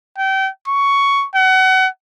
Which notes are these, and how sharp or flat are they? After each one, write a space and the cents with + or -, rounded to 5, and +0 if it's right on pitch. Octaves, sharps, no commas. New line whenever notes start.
G5 -30
C#6 +10
F#5 +30